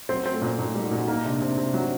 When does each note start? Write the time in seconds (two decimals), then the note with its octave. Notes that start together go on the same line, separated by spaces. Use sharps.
0.09 F#3 C4
0.26 C4
0.34 A3
0.42 A#2
0.59 A#2 D#4
0.75 G3 D#4
0.83 F#4
0.91 A#2
0.97 F#4
1.08 A#3 D#4
1.25 C3 D4
1.41 C3 C4
1.57 C3 C4
1.74 F#3